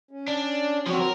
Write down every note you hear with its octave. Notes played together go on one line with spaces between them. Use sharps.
C#4
D4
F3 C4 F#4 C#5
A#4